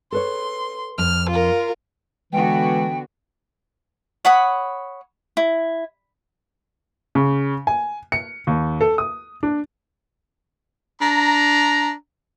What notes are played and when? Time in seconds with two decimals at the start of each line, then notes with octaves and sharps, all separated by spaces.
0.12 A4 B4 C#5 C6
0.98 F2 F6
1.29 F4 A#4
2.33 D3 E3 G#3 B3 F#4 G5
4.25 C#5 F#5 B5 D#6
5.37 E4
7.15 C#3
7.67 G#5
8.12 C#7
8.47 D#2
8.81 A4
8.98 D#6
9.43 D4
11.02 D4 A#5